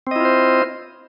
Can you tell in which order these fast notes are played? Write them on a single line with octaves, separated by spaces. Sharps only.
C4 D#5 E4 F4 C5